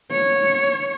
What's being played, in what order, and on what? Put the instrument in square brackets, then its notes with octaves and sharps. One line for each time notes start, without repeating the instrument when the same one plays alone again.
[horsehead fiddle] C#5